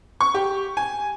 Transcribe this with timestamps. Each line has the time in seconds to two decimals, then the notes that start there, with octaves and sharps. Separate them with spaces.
0.21 C#6
0.34 G4
0.77 G#5